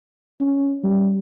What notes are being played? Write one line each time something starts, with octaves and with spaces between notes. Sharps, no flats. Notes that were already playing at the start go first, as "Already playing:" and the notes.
C#4
G3